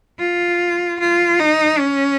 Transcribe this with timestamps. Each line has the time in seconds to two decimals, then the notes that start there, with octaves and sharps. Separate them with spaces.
0.19 F4
0.99 F4
1.40 D#4
1.80 C#4